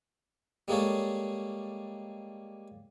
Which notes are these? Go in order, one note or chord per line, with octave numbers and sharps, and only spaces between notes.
G3 G#3 A#3 G#4 A4 C#5